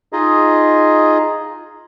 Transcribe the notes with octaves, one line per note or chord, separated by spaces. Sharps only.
D#4 F4 G#4 D#5